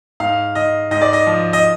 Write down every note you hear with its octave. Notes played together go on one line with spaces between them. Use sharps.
G#2 F5
G#2 D#5
G#2 D#5
D5
D#5
F3
D#5